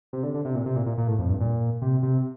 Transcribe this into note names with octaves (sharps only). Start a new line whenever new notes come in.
C3
D3
D3
C3
A#2
C3
A#2
A#2
A#2
A2
F2
G2
A#2
C3
C3